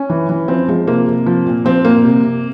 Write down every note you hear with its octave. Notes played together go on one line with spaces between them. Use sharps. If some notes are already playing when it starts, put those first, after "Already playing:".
Already playing: C#4
E3
E3
F3 C4
F3 G#3
C3 A#3
C3
F3
A#2
F3 C4
A#2 A#3
C3
C3